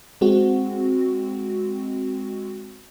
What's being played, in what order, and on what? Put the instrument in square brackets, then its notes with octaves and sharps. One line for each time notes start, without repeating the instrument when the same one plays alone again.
[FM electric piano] G#3 C4 F#4